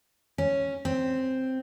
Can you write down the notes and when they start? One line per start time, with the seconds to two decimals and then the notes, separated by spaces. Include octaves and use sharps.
0.38 C#4
0.85 C4